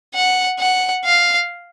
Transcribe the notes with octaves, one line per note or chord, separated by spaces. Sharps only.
F#5
F#5
F5